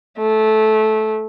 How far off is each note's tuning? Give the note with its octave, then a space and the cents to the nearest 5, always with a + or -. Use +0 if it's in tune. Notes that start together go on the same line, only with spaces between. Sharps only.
A3 -15